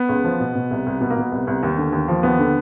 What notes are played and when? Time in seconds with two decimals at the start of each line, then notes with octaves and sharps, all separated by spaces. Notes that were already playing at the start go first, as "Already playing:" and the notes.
Already playing: B3
0.09 C#2
0.24 F3
0.40 B2
0.55 B2
0.71 C2
0.86 C2
1.01 B2 B3
1.10 A#3
1.16 B2 B3
1.32 C2
1.47 C2
1.63 D#2
1.78 D3
1.93 D#2
2.08 F3
2.23 D#2 B3
2.39 D3